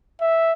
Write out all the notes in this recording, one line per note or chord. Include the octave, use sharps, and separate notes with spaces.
E5